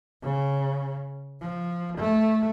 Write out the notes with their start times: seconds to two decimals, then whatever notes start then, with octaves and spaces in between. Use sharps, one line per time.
0.23 C#3
1.40 F3
1.98 A3